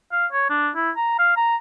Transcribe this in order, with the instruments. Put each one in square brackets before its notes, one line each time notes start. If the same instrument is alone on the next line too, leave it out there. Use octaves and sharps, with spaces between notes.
[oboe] F5
C#5
D4
E4
A#5
F5
A#5